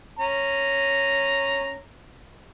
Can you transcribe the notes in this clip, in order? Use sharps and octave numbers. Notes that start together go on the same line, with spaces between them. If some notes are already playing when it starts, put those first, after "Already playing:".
C#4 A#5